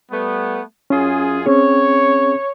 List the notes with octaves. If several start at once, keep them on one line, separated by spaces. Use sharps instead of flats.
G3 A3 B3
F#2 C#4 F4 G#4
C4 C#4 G#4 C#5